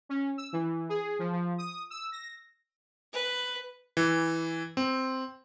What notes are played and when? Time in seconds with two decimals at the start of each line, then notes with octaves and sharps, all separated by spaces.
0.09 C#4
0.38 E6
0.53 E3
0.89 G#4
1.19 F3
1.33 F3
1.58 D#6
1.90 E6
2.12 A#6
3.13 B4
3.97 E3
4.77 C4